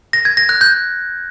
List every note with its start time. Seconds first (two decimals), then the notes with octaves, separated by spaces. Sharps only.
0.13 A#6
0.25 G#6
0.37 A#6
0.49 F#6
0.61 G6